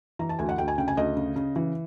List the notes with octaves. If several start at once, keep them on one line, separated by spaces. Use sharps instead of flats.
E3 A#5
A5
D2 G#5
F#5
D2 G5
G#5
C#3 G5
G#5
D2 D#5
C#3
C#3
E3